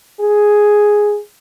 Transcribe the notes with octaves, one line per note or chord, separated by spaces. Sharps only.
G#4